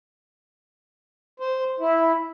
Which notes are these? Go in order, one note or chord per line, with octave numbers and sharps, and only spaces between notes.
C5
E4